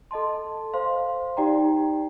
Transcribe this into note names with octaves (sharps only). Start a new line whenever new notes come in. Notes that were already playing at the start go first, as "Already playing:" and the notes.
A4 D#5 A5 C6
C5 F5 C6
D#4 G4 D5 G5 A#5